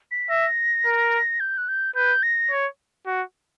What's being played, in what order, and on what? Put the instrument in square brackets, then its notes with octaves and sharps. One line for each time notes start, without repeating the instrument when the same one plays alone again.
[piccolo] B6
[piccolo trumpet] E5 [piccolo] A#6
[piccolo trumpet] A#4
[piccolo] G6
F#6
G6
[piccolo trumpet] B4 [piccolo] G6
[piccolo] A#6
[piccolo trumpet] C#5
F#4